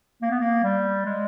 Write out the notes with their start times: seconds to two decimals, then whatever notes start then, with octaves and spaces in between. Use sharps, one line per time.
0.22 A#3
0.31 B3
0.40 A#3
0.63 G3
1.05 G#3